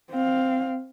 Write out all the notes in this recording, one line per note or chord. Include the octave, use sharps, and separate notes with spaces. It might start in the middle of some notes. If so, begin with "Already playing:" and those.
C4 F5